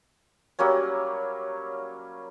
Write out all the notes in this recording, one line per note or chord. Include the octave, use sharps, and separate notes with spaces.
F#3 G3 A#3 C#4